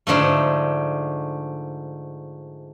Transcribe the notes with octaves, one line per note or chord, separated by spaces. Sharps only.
G#2 D3 F3 A3